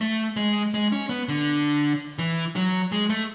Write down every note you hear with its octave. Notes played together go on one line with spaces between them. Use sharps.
A3
G#3
G#3
C#4
B3
D3
E3
F#3
G#3
A3